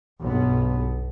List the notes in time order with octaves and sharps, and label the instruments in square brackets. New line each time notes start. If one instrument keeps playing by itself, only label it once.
[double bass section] B1 G2 B3